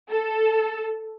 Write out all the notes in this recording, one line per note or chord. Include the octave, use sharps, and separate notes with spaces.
A4